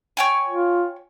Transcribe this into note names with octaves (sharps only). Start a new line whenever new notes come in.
C#5 G5 G#5
F4